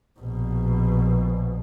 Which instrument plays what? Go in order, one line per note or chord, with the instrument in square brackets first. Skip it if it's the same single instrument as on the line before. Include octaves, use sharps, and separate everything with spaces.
[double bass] A#1 B2